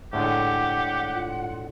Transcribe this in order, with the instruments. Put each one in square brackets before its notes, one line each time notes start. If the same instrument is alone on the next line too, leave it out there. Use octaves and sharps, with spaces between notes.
[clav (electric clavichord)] A2 D3 G#3 [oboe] G4 [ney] F#5
[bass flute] F4